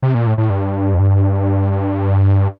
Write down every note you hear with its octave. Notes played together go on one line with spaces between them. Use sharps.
C3
A#2
A2
A2
G2
F2
G2